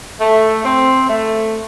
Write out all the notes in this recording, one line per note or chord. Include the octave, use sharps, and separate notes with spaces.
A3
C4
A3